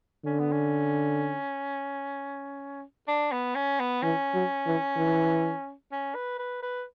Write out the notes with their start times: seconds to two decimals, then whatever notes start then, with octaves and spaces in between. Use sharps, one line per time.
0.25 D3 C#4
0.39 B3
0.52 C#4
3.08 D4
3.32 B3
3.55 C#4
3.80 B3
4.03 E3 C#4
4.34 F#3
4.66 E3
4.97 E3
5.92 C#4
6.15 B4
6.39 B4
6.63 B4